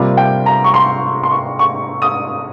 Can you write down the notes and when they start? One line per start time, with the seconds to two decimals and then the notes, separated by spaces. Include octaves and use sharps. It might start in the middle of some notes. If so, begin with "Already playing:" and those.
Already playing: C3 G3 A#3 F4
0.17 G5
0.46 A#5
0.64 C#6
0.74 C6
1.23 C6
1.31 C#6
1.59 C#6
2.02 D#6